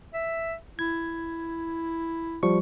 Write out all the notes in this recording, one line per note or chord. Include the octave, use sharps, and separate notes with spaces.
E5
E4 G#6
F3 G3 C#6